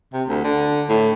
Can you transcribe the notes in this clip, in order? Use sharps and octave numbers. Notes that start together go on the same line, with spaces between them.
C3
D2
D3
A2